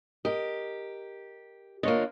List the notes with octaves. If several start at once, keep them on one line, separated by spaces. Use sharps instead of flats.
G4 A#4 D#5
D3 A#3 F4 C#5 D#5